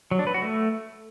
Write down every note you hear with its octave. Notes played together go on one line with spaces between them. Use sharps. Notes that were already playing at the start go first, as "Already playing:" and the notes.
F#3
D4
B4
F#4
A3